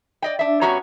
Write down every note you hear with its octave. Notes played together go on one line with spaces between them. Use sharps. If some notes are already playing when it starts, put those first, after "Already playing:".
D5 D#5 G5
D4 E5
G2 B3 C#4 F#4 C#5 A#5